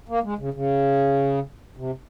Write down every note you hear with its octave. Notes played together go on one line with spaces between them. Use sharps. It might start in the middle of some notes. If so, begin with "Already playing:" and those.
A#3
G#3
C#3
C#3
C3